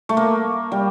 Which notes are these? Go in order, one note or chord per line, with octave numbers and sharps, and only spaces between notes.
A3
A#3
G3